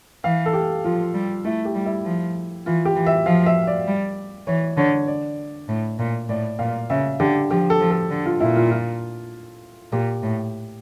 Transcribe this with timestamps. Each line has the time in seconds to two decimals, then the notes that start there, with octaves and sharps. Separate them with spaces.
0.24 E3 F5
0.46 A4
0.53 G4
0.84 F3 F4
1.14 G3
1.44 A3 E4
1.65 G4
1.75 G3
1.86 E4
2.05 F3
2.66 E3 F4
2.85 G4
2.96 E3
3.06 E5
3.26 F3 F5
3.46 E5
3.67 D5
3.87 G3
4.47 E3 C#5
4.77 D3 C#5
5.07 D5
5.69 A2
5.99 A#2
6.29 A2 D5
6.59 A#2 F5
6.90 C#3 E5
7.20 D3 G4
7.50 F3 G4
7.70 A4
7.80 F3
7.91 A4
8.10 D3
8.26 F4
8.40 A#2 E4
8.56 F4
8.71 F4
9.92 A#2 G4
10.23 A2